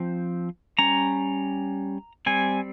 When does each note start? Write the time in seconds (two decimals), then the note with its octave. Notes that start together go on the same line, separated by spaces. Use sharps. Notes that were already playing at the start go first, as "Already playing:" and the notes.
Already playing: F3 C4
0.78 G3 C#4 A#5
2.26 G3 C4 G#5